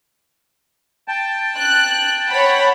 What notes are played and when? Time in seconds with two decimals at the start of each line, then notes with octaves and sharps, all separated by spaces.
1.08 G5 A5
1.58 F#6
2.31 C#5 F#5 B5